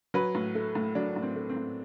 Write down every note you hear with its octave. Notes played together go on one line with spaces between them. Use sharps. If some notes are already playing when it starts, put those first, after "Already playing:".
F#3 B4
A2
A3
A2
F#3 D4
A2
C4
A3
C4
A2